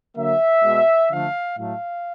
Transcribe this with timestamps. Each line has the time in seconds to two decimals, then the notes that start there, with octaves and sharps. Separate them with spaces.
0.16 D3 F#3 A#3 E5
0.63 B2 G#3
1.10 D3 F3 A3 F5
1.56 A2 F#3 A3 F5